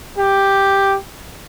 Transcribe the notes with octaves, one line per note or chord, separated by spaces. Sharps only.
G4